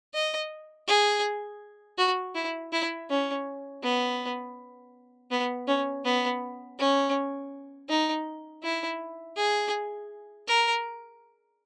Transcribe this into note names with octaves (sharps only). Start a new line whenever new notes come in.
D#5
G#4
F#4
E4
E4
C#4
B3
B3
C#4
B3
C#4
D#4
E4
G#4
A#4